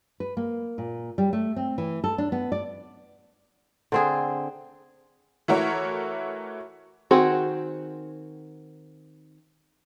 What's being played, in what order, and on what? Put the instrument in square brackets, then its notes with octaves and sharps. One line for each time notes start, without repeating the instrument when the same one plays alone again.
[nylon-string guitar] B4
A#3
A#2
G3
A3
C4
E3
A4
D4
B3
D5
[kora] D3 C4 G#4
[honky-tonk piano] E3 A3 E4 F#4 A#4 C#5
[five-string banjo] D#3 C4 F#4 G#4